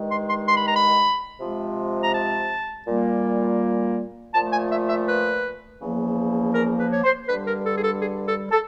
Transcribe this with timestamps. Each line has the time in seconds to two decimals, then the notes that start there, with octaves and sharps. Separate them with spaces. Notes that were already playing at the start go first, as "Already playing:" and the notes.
Already playing: G2 D#3 G#3
0.11 C6
0.29 C6
0.48 C6
0.57 B5
0.66 A#5
0.76 B5
1.40 C3 F3 G#3
2.02 A#5
2.14 A5
2.87 A#2 G3 A#3
4.34 A#2 F3 A3 A5
4.52 G#5
4.71 E5
4.89 E5
5.08 B4
5.81 E2 C#3 F3 A#3
6.55 A#4
6.79 B4
6.92 C#5
7.04 C5
7.28 G2 D3 G3 B4
7.47 A#4
7.65 A4
7.77 G#4
7.84 A4
8.02 G#4
8.27 A4
8.51 A4